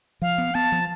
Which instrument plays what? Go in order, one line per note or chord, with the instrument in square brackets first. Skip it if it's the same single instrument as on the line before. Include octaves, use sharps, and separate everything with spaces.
[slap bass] F3 [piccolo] F5
[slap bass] B3
[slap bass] B3 [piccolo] A5
[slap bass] F3